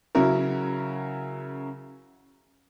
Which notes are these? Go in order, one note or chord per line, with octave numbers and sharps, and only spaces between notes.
C#3 F#3 C#4 E4 F#4 A#4